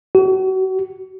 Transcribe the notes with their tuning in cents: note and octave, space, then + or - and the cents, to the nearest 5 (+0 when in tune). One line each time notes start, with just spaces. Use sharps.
F#4 +35